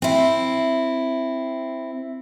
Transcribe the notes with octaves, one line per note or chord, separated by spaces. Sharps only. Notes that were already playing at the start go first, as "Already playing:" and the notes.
C4 E4